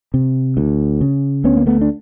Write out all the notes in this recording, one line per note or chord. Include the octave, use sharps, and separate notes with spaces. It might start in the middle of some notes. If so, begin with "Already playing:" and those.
C3
D2
C#3
D2 B3 C#4
A#3
A3 B3
D4